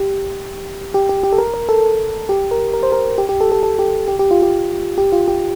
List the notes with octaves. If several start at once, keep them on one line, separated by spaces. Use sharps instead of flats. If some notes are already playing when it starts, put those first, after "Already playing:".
Already playing: G4
G4
G4
G4
A4
A#4
A#4
A4
G4
A#4
A#4
C5
A#4
G4
G4
A4
A4
A4
G4
G4
G4
F4
G4
G4
F4
G4